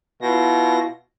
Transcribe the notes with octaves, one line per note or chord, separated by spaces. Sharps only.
B2 E4 F4 A#6